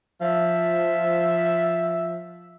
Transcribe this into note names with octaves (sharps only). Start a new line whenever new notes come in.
F3 E5